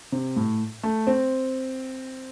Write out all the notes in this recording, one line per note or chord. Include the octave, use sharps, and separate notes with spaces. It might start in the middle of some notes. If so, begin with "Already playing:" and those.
C3
A2
A3
C4